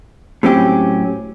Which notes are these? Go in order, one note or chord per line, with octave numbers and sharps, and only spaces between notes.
A2 F#3 C4 C#4 G4